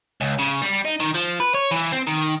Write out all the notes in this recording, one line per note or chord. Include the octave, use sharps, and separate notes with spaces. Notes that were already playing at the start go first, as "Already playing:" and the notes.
C#2
C#3
G3
D#4
D#3
F3
B4
C#5
E3
C4
D#3